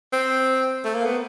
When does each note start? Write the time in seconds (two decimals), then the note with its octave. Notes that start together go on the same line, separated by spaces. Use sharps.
0.12 C4
0.84 A3
0.95 A#3
1.06 B3